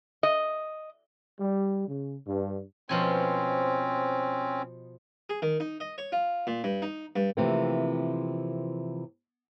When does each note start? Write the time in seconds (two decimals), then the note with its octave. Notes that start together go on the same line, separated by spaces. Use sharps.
0.23 D#5
1.40 G3
1.88 C#3
2.27 G2
2.89 B2 F3 C4 C#4 G#5
5.30 G#4
5.42 D#3
5.60 D#4
5.80 D#5
5.98 C#5
6.12 F4
6.47 A#2
6.64 G2
6.82 D#4
7.16 G2
7.37 C3 E3 F3 A3 A#3 C4